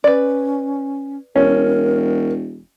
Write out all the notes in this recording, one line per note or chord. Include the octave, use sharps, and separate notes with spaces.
C#4 B4 D5
E1 C#4 A#4